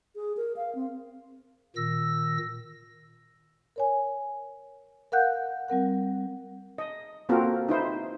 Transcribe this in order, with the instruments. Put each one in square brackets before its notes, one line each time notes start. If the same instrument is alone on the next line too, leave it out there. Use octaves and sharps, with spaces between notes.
[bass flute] G#4
A#4
F5
C4
[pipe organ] A#2 D#3 E6 A#6
[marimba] A#4 C#5 G#5
A#4 F5 F#5 F#6 G6
G3 C4 A#4 F#5
[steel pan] D#5
A#3 C4 F4 F#4 A4 A#4
D#4 E4 C5